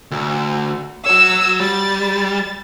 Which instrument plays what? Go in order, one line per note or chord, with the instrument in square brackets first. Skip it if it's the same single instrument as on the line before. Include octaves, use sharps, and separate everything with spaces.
[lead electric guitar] D2
[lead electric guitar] F#4 C#5 [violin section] E6
[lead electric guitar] G3 [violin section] A6